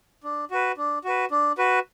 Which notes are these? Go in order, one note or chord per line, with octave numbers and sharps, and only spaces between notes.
D4
F#4 B4
D4
F#4 B4
D4
F#4 B4